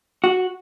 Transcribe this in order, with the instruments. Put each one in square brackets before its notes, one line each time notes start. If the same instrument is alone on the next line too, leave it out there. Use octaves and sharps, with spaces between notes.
[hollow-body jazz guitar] F#4